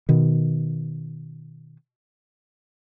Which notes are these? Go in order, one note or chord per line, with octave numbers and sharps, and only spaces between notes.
B2 D#3